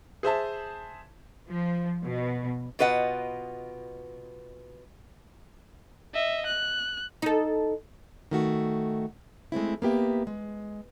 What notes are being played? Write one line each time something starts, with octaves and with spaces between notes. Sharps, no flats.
G#4 C5 E5 A5
F3
B2
B2 F4 B4 D#5 F#5
D#5 E5
F#6
D#4 A4
D#3 A3 F#4
G#3 A3 C4 E4
A#3 B3 G4 E5
G#3